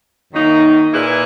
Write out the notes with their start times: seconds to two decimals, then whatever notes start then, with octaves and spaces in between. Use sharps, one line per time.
0.31 F#2 D#3 A#3 D#4 F#4
0.93 A#2 A#3 E4 G#4 B4